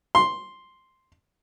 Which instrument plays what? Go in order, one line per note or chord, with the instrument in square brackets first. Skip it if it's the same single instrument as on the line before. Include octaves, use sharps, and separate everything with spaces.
[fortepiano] C6